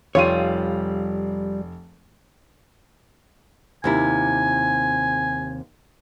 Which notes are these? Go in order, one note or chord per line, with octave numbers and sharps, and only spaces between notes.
F1 G3 F4 C#5 F5 D#7
D#2 C3 E4 G#5